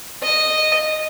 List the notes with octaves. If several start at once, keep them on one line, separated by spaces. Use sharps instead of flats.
D#5